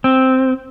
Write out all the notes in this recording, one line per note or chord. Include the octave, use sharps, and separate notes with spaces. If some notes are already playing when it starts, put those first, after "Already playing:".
C4